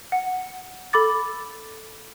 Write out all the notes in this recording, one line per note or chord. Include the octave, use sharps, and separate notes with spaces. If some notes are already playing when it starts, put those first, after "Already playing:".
F#5
A4 B5 D6 A6